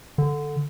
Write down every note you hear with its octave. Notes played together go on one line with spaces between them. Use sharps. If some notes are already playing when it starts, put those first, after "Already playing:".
D3